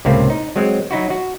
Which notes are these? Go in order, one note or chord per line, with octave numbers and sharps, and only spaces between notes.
C#2 A2 C3 A#3 C4 E4
D#4
F#3 G#3 C4
F#3 D#4 E4 F#4
F#4